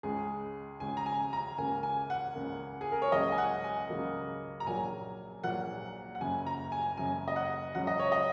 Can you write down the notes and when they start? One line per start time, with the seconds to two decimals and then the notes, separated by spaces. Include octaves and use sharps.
0.03 C#2 C#3 G#3 G#4
0.80 C#2 C#3 G#3 G#5
0.97 A#5
1.06 G#5
1.33 A#5
1.58 C#2 C#3 A#3 G#5
1.83 G#5
2.10 F#5
2.35 C#2 C#3 A#3
2.81 G#4
2.92 A#4
3.02 C#5
3.12 C#2 C#3 F#3 A#3 D#5
3.32 G#5
3.38 F#5
3.64 G#5
3.89 C#2 C#3 F#3 A#3
4.60 A#5
4.66 A#1 A#2 F#3 A#3 G#5
5.43 A#1 A#2 F#3 A#3 F#5
6.15 F#5
6.20 F#1 F#2 C#3 G#5
6.47 A#5
6.72 G#5
6.97 F#1 F#2 C#3 G#5
7.28 D#5
7.36 F#5
7.75 C#2 C#3 F#3 F#5
7.87 D#5
8.00 C#5
8.12 D#5